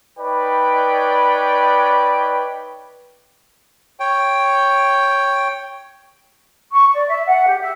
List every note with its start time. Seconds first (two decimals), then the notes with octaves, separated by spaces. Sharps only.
0.18 D#4 B4 C#5 D5 G5 B5
4.00 C#5 G5
6.72 C#6
6.94 D5
7.08 E5
7.27 F#5
7.48 G4
7.61 E5